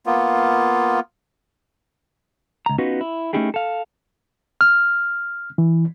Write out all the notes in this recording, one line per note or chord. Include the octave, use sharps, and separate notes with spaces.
A#3 B3 F4
C#2 A#5
B3 C#4 D#4 F4 F#4 B4
E4
A3 C#4 D#4 E4 G4 G#4
A4 F5
F6
E3